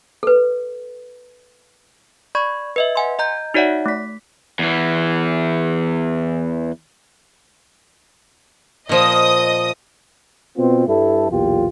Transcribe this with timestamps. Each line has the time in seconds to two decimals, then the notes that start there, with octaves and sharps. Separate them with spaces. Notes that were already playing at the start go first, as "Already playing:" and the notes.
0.23 A4 B4
2.35 D5 B5 C#6 G#6
2.76 B4 D#5 E5
2.96 F#5 G#5 C6
3.19 D#5 A#5 G6
3.54 D#4 F#4 C#5 D5 E5 F#5
3.86 A3 B6
4.59 E2 E3
8.89 A#2 F3 D#5 D#6
10.58 B2 B3 C4 F4
10.88 G2 G3 E4 A4
11.30 B1 E2 A#2 F4 G4